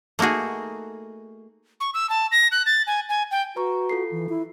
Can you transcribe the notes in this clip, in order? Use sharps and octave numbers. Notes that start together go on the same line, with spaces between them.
A3 A#3 D#4 F#4 G#4
C#6
E6
A5
A#6
F#6
A6
G#5
G#5
G5
F#4 B4 A#5 C#6
F4 A4 C7
E3
E4